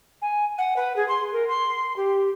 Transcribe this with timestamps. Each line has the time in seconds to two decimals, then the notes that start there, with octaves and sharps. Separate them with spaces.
0.22 G#5
0.58 F#5
0.76 B4
0.96 G#4
1.08 C6
1.32 A#4
1.48 C6
1.96 G4